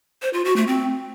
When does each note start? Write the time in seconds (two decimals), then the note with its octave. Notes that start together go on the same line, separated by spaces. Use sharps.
0.22 C5
0.33 F4
0.45 F#4
0.56 A3
0.68 C4